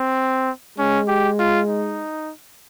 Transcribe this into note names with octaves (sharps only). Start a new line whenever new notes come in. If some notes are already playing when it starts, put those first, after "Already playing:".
Already playing: C4
G#3 C#4
G4
F4
D#4